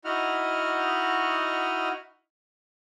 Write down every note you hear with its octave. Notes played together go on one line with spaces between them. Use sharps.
D#4 E4 F#4 D#5 F#5 F6